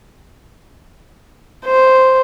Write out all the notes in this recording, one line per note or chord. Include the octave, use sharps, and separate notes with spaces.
C5